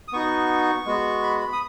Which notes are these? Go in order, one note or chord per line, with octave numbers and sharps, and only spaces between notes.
D#6
B3 D#4 F#4 C#6
G#3 B3 F#4
B5
B5
D#6